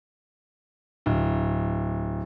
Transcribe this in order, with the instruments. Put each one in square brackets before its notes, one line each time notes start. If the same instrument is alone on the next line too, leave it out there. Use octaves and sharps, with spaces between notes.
[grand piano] D1